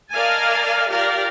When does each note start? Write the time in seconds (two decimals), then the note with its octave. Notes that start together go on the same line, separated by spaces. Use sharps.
0.11 A#4 D5 D#5 F5 G#5 A5
0.89 F4 G4 A#4 D5 F5